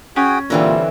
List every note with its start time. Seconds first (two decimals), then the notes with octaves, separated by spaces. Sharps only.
0.16 C#4 F#4 G#4 G5
0.50 A#2 D3 E3 G3 C4